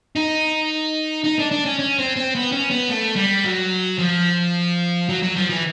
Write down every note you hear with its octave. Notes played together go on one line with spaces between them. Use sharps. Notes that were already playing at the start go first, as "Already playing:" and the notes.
D#4
D#4
D4
D4
C#4
C#4
C4
C4
B3
C#4
B3
A3
G3
F#3
F3
F#3
F#3
F3
E3